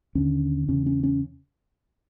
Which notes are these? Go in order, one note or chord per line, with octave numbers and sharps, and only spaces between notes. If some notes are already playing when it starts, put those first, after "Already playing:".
D#2 D3 C#4
E2 C#3 C#4
C#4
C#4